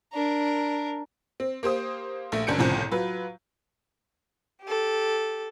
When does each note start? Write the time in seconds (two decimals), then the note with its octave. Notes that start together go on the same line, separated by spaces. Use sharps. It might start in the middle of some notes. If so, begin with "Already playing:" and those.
0.13 D4 A#4
1.40 C4
1.63 A#3 G4 C5 D#6
2.32 A#1 A3
2.47 F#1 F#2 D4 G6 C#7 D7
2.58 G1 C2 A2 C#3 F3
2.91 F#3 F4 B4
4.63 G4 A4